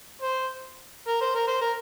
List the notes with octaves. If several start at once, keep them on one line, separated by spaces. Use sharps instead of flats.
C5
A#4
C5
A#4
C5
A#4